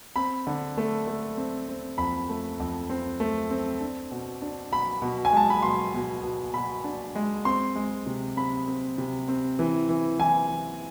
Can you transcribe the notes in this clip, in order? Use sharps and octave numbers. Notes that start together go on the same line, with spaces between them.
C4 B5
D3
A3
A3
C4
C4
F2 B5
A3
F2
C4
A3
C4
D4
B2
D4
B2 B5
B2
G#5
G#3 A5
B5
B2 C6
B2
B2
B2 B5
D4
G#3
C4 C6
G#3
C3
C4 B5
C4
C3
C4
E3
E3
E3 G#5
E3